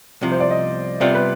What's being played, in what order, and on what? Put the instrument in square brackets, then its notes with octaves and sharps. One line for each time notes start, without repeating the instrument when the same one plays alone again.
[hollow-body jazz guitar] C2 C3 F3
[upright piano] C5
D5
D#5
[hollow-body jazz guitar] C3 G3 B3 F4 [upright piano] D5
[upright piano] B4